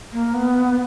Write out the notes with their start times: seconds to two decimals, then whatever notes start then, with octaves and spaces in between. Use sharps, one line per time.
0.13 A#3
0.34 B3